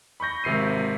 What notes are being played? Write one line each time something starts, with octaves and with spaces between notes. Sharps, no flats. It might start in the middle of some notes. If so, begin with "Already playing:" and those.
B5 C#6 G6 A#6
G#1 C3 C7 D#7